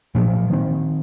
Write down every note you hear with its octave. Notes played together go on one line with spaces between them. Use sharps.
A#2 F3 F#3
D#3 C4